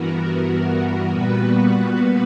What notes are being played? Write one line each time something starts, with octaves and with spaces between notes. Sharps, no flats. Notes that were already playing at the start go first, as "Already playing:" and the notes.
Already playing: G2 E3 B3 F#4 A#4
A#2 G3 B3 F#4 B4